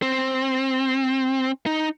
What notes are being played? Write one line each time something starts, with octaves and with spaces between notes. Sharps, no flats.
C4
D#4